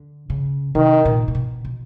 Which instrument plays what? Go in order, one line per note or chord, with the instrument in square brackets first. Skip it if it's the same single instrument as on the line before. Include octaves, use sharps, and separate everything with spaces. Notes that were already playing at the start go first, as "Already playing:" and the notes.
Already playing: [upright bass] D3
C#3
[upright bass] C3 [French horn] D#3
[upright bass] A#2
A#2
B2
B2